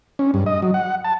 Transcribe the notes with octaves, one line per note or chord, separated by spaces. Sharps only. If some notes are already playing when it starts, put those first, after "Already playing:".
C#4
G2
D#5
F#3
F#5
A5